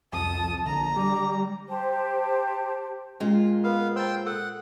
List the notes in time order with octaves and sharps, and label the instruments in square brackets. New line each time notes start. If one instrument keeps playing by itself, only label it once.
[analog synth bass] C2 [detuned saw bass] F2 [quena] A5 [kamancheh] D#6
[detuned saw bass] A#1 [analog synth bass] D3 [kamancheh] A#5
[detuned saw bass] G3 [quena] D6
[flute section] G4 C5 A5
[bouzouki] A#2 F4 [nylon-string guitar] G#3 [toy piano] C#4
[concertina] B3 F5 [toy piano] A#4
[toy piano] C5 D#5 [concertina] G5 C6 E6
[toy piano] A4 E6 [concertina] F#5